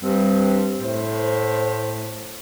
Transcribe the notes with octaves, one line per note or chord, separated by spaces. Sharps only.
G2 C4
A2 C5